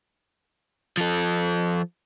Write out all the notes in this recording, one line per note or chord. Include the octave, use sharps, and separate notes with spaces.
F3 A4